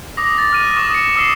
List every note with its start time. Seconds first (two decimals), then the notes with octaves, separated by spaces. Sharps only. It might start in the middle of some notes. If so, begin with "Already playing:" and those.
0.17 D6 D#6 A#6
0.38 A6
0.52 F6 D#7
0.77 C#6 D#6 E7
0.94 C#7
1.16 D#6 E6 C7 E7